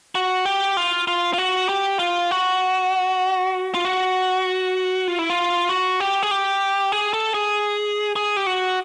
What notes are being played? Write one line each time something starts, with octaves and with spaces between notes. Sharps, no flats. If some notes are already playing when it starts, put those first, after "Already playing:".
F#4
G4
F4
F4
F4
F#4
G4
F4
F#4
F4
F#4
F4
E4
F4
F#4
G4
G#4
G4
G#4
A4
G#4
G#4
G4
F#4